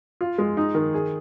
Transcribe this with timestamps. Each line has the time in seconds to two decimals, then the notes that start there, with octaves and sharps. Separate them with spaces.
0.21 F4
0.38 G#3
0.57 D#4
0.75 D#3
0.94 G#4